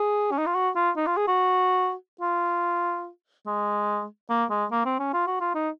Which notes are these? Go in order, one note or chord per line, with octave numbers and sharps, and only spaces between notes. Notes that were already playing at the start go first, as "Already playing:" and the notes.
Already playing: G#4
C#4
D#4
F4
F#4
F4
D#4
F4
G#4
F#4
F4
G#3
A#3
G#3
A#3
C4
C#4
F4
F#4
F4
D#4